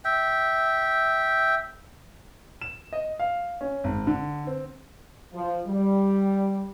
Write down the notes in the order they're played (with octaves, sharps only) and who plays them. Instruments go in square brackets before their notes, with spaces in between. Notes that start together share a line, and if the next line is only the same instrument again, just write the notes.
[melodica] E5 G5
[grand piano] E7
D#5
F5
C#4
G#1
D3
C4
[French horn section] F3
G3